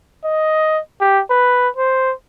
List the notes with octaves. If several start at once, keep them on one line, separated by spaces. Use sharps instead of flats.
D#5
G4
B4
C5